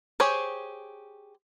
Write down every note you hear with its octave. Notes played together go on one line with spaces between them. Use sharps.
G4 G#4 C5 C#5